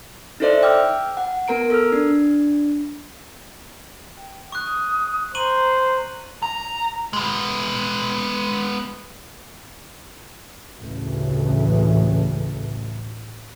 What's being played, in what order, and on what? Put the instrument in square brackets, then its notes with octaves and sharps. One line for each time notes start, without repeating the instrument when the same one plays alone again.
[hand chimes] D#4 E4 A4 C5 D5 E5
G5 D6 E6 F6
F#5
B3 A#4 A#5 D7
A4 E6 F6
D4
[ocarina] G5
[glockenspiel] C#6 F#6 [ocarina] D#6
[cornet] C5 [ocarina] A#5 [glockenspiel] C#6 D#7 F#7
[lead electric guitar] A#5
G#3 B3
[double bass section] A1 D2 A2 C#3 E3 A3